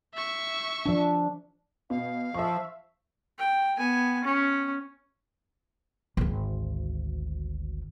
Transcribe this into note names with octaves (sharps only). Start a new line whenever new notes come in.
E5 C#6
F3 D4
B2 F5
F3 E5 C#6
G5
B3 G#5
C#4
G#1 D2